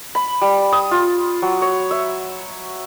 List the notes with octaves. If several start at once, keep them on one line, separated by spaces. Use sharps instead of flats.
B5
G3
D#6
F4
F#3
C#5
E5